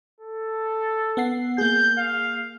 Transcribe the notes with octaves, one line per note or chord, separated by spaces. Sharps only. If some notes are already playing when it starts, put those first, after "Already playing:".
A4
B3 F#5 C7
A#3 G#4 G6
F5